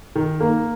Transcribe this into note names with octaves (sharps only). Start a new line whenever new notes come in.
D#3
A#3